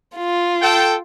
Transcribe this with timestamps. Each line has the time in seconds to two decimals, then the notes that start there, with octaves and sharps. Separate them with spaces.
0.16 F4
0.61 A4 G5